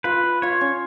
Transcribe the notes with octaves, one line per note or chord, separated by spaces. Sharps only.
F4 B4
F4
F4 C#5
C#4